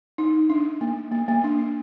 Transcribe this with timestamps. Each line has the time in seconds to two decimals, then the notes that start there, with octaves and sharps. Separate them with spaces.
0.18 D#4
0.50 D4
0.81 A#3
1.12 A#3
1.28 A#3
1.44 D4
1.58 D4